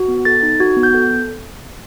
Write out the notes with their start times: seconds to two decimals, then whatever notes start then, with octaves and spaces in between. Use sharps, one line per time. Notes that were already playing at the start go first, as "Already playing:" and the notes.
Already playing: F#4
0.08 B3
0.25 A4 A6
0.43 D#4
0.60 F#4 G#6
0.77 B3
0.83 G6
0.94 A4